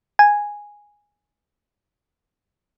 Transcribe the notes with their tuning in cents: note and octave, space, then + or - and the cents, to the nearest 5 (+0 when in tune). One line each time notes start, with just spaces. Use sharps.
G#5 -5